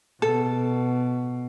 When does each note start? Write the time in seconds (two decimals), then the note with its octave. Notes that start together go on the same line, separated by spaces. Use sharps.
0.22 B2 A4